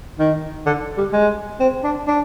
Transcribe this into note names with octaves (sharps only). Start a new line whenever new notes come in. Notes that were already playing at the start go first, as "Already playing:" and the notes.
D#3
D3
G3
G#3
C4
D4
D4